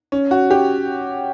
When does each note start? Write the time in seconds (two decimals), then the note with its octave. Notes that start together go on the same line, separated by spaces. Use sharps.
0.12 C#4
0.31 F#4
0.51 G4